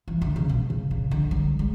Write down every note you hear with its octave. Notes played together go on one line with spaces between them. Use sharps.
E3
D3
C#3
B2
C#3
C#3
D3
F#3
G#3